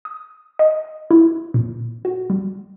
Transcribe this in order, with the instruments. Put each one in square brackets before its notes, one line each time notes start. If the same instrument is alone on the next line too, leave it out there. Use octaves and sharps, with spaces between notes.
[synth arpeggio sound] D#6
D#5
E4
A#2
F#4
G3